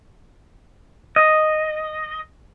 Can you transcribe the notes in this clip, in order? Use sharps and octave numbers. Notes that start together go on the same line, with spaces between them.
D#5